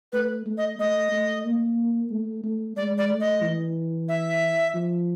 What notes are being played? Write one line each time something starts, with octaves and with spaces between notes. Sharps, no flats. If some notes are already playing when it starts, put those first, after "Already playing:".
A3 B4
A3
D#5
A3 D#5
A3
A#3
A3
A3
G#3 D5
D5
A3
D#5
E3
E5
F3